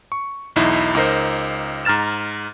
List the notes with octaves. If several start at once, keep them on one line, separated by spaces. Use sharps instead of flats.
C#6
B1 E2 D#4 E4
C#2 D#4 A#4 C5
G#2 A#5 F6 A6 E7